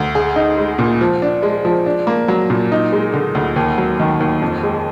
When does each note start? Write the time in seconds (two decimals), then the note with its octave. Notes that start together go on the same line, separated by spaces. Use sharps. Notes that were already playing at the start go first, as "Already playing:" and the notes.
Already playing: D2
0.15 G#4
0.36 D#4
0.57 G#3
0.79 A#2
1.01 F3
1.22 D4
1.43 G#3
1.65 F3
1.86 D4
2.07 A#3
2.28 F#3
2.50 A#2
2.72 D#4
2.92 G#3
3.14 D3
3.35 D2
3.56 D#2
3.78 F#3
4.00 D#3
4.20 D#2
4.42 F2
4.63 G#3